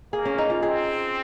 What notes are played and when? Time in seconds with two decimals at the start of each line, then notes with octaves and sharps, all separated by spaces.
0.13 A#3 G#4
0.25 C#4
0.38 D#4
0.50 F4
0.62 C4 G#4